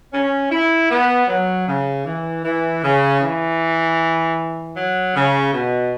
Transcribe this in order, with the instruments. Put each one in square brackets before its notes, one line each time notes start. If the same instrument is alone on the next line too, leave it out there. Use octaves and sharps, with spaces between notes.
[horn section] C#4
E4
B3
F#3
C#3
E3
E3
C#3
E3
F#3
C#3
B2